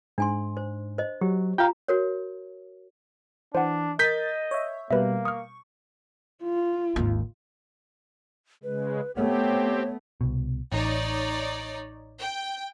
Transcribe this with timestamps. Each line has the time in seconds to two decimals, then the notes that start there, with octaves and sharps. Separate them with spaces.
0.18 G#2 D4 G#5 C6
0.57 C5
0.98 C5 D#5
1.21 F#3 G4
1.58 F4 F5 G5 A#5
1.88 F#4 A#4 C#5
3.55 E3 D4 C5 F#5
3.99 A#4 D#5 D#6 G6 A6 B6
4.51 C#5 E5
4.90 B2 G3 A#3 B4 E5
5.25 C#6 D#6 F6
6.43 F4
6.96 G#1 D#2
8.63 C#3 G#3 B4
9.17 A3 B3 C4 G4 C#5
10.21 C2 B2
10.72 A1 D#4 C#5 D5
12.20 G5